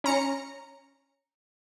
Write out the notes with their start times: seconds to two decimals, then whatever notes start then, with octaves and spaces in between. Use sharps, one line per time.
0.04 C#4 A#5 C#7